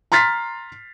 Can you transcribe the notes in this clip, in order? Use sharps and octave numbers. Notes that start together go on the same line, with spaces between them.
A#5 C6 F6 A6 B6 C7